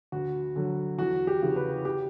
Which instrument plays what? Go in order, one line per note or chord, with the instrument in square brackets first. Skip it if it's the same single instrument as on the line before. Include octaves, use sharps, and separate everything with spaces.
[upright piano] D2 F#4
D3 F#3
E2 F#4
G4
C#3 E3
B4
G4